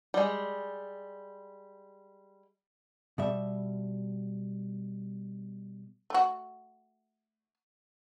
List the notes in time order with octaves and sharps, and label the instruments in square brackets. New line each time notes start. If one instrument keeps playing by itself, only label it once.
[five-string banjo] G3 G#3
[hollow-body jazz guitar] B2 G3 E5
[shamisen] A3 F#4